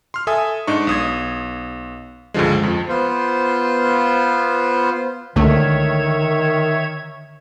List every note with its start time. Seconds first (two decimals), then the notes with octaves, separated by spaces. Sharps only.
0.14 C6 F6
0.27 A4 E5 G#5 D#6
0.67 G#2 D4 D#4 C#6
0.87 B1 D#6 G#6
2.34 C#2 G2 D3 F3 G#3
2.63 F2 F3
2.89 B3 F4 C5
5.36 C#2 D3 D#3 A3 C#5 E5 G#6